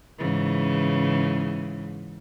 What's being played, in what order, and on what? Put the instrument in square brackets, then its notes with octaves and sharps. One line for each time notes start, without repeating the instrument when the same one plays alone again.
[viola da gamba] G#2 C#3 E3